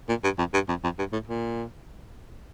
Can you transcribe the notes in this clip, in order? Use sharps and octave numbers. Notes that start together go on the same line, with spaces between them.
A#2
G2
F2
G2
F2
F2
G2
A2
A#2